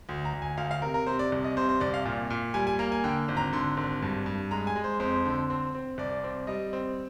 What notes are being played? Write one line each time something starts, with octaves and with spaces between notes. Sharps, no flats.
D2
A#5
D2
G#5
D2 F5
F5
C3 A#4
A#4
C3 C5
D5
C2
D#5
C3 C5
C5
C2 D5
F5
A#2
A#2
G3 G#5
G#5
A#3 A#5
G#5
D3 G5
G#1
A#5
D3 C6
G#1
G2
G2
G#3 A#5
G#5
G#3
C5
F2 C5
D3
C4
C4
C2 D5
C4
G3 D#5
C4